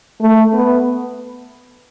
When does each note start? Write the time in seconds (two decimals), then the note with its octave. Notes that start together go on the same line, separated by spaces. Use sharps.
0.21 A3
0.53 B3